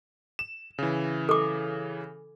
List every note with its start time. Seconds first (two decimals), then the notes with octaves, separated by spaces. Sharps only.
0.39 E7
0.78 C#3 E3
1.29 A4 D6